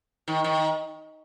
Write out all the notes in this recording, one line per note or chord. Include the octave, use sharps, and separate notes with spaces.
D#3
D#3